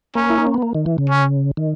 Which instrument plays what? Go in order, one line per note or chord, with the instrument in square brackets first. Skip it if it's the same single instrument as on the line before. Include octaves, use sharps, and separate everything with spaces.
[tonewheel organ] A#3 [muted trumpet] C#4
[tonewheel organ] E4
D#4
C#4
B3
A#3
D#3
E3
C#3
[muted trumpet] C#4
[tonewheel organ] D#3